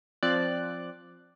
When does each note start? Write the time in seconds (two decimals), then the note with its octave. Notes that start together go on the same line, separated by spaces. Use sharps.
0.23 F3 C4 D5 F#6